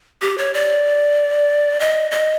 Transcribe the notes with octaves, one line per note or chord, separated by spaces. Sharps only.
G4
C#5
D5
D#5
D#5